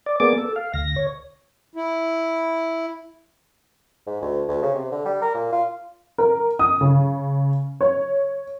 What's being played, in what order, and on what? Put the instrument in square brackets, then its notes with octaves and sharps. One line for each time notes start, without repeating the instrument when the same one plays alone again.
[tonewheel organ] D5
A#3 B3 G#4 D5 D6
A4
F5
D2 A#6
C#5
[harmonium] E4
[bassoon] G#2
D2
D2
C#3
C3
D3
G3
A#4
A#2
F4
[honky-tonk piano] A#4
D#6
C#3
C#5